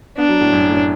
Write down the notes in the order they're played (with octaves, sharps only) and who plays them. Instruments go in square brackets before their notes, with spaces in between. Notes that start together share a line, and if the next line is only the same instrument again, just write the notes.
[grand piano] B3 [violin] D4
[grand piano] F#3
A2
F#2
A2